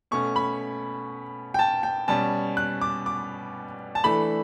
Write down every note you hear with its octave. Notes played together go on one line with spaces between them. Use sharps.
B2 A3 C#4 C#6
B5
G5
A5
G5
B2 G3 C#4 A5
F#6
D6
D6
A5
E3 A3 D4 B5